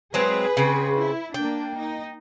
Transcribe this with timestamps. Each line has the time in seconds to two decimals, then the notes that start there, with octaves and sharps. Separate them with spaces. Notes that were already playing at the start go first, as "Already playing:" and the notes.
0.14 F#3 G#3 C4 G#4 B4
0.57 C#3 C4
0.96 E4
1.34 A#3 D4 G5
1.78 D#4